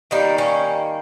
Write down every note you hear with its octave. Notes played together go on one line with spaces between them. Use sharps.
D#3 G3 A#3 D#4
C#4